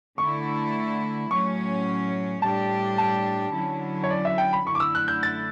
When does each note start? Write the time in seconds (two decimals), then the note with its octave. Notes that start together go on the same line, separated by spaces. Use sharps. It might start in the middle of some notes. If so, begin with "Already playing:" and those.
0.18 D3 A3 E4 A4 C#6
1.30 A2 F#3 C#4 C#6
2.42 A2 G3 D4 G4 A5
2.98 A5
3.54 D3 F#3 C#4 E4
4.04 C#5
4.10 D5
4.25 E5
4.38 G5
4.53 B5
4.66 F#2 D3 A3 E4 C#6
4.75 D6
4.80 E6
4.95 F#6
5.08 G6
5.23 A6